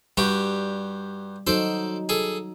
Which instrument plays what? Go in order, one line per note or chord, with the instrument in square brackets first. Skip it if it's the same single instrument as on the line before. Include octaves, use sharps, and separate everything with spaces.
[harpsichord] G2 F#4 G4 [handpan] G3
[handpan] F#3 D#4 F#4 [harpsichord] A4 C5 D5
[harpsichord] G#4 A4